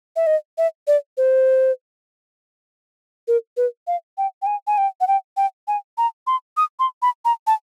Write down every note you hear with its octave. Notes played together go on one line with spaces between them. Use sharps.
E5
D#5
E5
D5
C5
A#4
B4
F5
G5
G5
G#5
G#5
G5
F#5
G5
G5
G#5
A#5
C6
D#6
C6
B5
A#5
A5